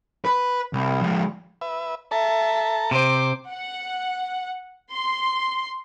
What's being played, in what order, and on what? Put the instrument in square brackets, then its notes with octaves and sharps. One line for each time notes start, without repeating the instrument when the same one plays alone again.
[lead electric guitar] B4
C2
F3 G#3
[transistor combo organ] B4 E5
[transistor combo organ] A4 A5 A#5 [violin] E5
[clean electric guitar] C3 [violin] C5 D6
[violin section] F#5
C6